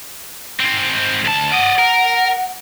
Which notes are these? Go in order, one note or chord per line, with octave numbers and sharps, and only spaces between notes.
G#2 C4
D2 A5
D5 D#5 F#5
A#4